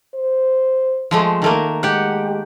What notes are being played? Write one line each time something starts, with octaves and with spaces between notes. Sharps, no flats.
C5
F3 G#3 A3
D#3 A3 A#3 A#4
G#3 G4 F#5